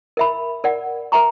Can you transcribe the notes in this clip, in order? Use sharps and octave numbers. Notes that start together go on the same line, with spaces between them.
A#4 E5 B5
A#4 D5 F#5
A#4 E5 G5 A#5 C#6